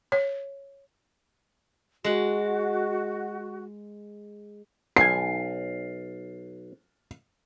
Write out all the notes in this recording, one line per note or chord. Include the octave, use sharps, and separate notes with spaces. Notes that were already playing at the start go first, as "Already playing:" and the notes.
C#5
G#3 F#4 F#5
B1 G#5 C7